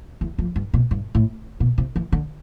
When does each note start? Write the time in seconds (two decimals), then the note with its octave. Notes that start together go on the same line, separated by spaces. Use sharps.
0.21 E2
0.38 F2
0.56 G2
0.74 B2
0.91 G2
1.15 A2
1.60 B2
1.78 C3
1.96 E3
2.12 D3